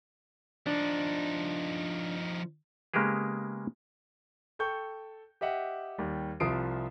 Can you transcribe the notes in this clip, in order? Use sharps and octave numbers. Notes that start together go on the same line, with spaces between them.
F3 D4 D#4
C#3 G#3 A#3 B3 G4 G#4
A4 G5 C#6 G6
G4 D#5 E5 F#5
D#2 G3
C2 C3 F3 D#6 C7 D7